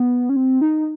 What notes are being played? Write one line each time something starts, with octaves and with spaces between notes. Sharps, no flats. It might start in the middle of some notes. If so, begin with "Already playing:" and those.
Already playing: B3
C#4
C4
D#4